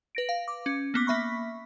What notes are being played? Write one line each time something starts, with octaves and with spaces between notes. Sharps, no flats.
B4 A#6 D7
F5
D6
C#4
A#3 B3 D6
A#3 E5 B5 C#6 B6